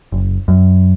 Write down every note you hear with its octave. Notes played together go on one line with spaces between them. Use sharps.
F#1
F#2